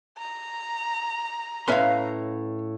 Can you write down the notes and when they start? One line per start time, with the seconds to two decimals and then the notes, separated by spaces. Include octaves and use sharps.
0.18 A#5
1.68 A2 C#4 B4 E5 F5 C6